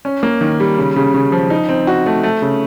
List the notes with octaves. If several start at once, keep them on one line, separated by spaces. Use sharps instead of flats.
C#4
A#3
D#3
G3
C#3
C#3
C#3
F3
D#4
C4
F#4
A3
A3
C#3